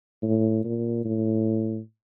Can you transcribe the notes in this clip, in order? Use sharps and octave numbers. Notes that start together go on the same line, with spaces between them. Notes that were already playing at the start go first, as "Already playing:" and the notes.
A2
A#2
A2